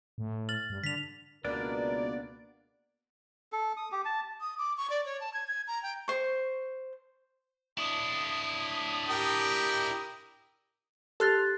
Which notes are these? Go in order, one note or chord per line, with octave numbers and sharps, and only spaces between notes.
A2
F6 A6 F#7
G2
D3 B6 F7
C#2 B2 A#3 B3 D4 A#4 D5
A4
D#6
G4
A5
D#6
D6
C#6
D5
C#5
A5
G#6
G#6
A#5
G5
C5 C#6
D4 E4 D#6
G4 A#4 G5
G4 A4 C6 F6 F#6 A6